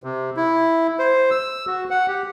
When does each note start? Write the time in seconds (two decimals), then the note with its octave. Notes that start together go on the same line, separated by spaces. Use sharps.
0.03 C3
0.37 E4
0.99 C5
1.31 E6
1.67 F#4
1.91 F#5
2.08 G4